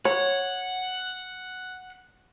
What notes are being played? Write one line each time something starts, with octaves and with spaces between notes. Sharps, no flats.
C#5 F#5